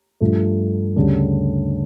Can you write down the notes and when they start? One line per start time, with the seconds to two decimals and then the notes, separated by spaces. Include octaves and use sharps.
0.20 G2 F3 A3
0.96 D2 C#3 G3 D4